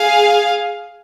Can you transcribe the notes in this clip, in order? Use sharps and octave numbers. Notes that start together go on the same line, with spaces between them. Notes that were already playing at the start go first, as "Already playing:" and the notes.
Already playing: G#4 F5